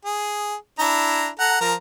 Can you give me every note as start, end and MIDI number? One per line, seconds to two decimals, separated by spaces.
0.05 0.55 68
0.79 1.28 62
0.79 1.28 64
0.79 1.28 82
1.39 1.61 69
1.39 1.61 78
1.39 1.61 82
1.61 1.74 53
1.61 1.74 70